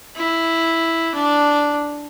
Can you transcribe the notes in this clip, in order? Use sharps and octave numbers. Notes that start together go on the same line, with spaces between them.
E4
D4